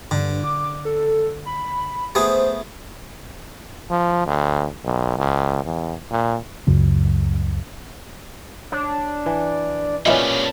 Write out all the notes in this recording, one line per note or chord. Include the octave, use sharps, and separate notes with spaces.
G2 D3
D6
A4
B5
A3 B3 G#4 C5
F3
D2
B1
C#2
E2
A#2
C#2 F#2 C#3
D4 C#5
E3
A#2 G3 A3 B3 C#4 D#4 E4